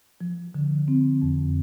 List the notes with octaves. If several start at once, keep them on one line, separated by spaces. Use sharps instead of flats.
F3
D3
C4
F2